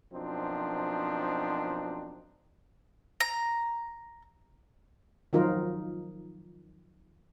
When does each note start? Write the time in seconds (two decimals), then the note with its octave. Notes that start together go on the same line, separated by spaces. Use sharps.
0.12 F#2 B2 F3 C4 D4 D#4
3.20 A#5
5.33 D#3 F3 F#3 D#4 F4 A#4